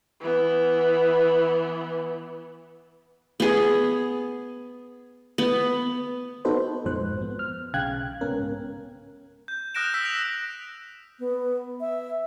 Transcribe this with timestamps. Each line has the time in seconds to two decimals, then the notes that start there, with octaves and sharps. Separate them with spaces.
0.20 E3 B3
3.40 B3 G#4
5.38 B3
6.45 B3 D#4 F#4 A4 B4 C5
6.84 A#1 F2 G#2 F3 C5 F#6
7.22 B3
7.39 F6
7.74 B1 C#3 F5 G5 F#6 G#6
8.21 C2 G#2 B3 C#4 A#4
9.48 G6
9.75 D#6 F6 F#6 A#6 D7 E7
9.94 D#6 E6 B6
10.05 F7
11.19 B3
11.81 E5